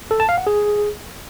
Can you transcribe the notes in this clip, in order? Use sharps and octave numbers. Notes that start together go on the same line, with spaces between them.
A4
A5
F5
F#5
G#4